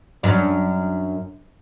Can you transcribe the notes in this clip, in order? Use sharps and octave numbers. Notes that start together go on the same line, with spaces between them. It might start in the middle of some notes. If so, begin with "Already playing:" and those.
F#2 D4